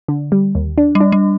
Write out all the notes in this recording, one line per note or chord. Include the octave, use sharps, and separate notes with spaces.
D3
G3
D#2
D4
G3
D4
G3